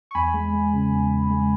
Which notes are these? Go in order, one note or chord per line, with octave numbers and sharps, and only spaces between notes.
C#6
E2 G#5 B5
G#3
G#3
C#3
E2
E2
G#3